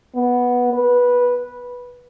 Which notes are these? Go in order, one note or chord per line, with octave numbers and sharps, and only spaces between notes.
B3
B4